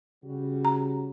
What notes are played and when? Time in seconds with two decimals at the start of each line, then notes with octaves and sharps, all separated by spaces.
0.24 C#3 G3 F#4
0.65 A#5